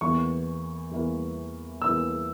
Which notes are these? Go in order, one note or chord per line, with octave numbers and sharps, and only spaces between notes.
E2 E3 A#3 C#6
E2 E3 A#3
E2 E3 A#3 E6